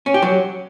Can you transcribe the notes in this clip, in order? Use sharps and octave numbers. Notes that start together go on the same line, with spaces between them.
C#4
G4
F#3